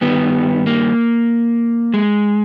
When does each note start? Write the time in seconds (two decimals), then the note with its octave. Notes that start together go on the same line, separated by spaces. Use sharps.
0.01 G2 D#3 G3 B3
0.67 A#3
1.94 G#3